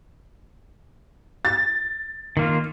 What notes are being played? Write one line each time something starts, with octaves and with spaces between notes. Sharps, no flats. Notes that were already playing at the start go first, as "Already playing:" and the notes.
A6
D#3 A#3 F4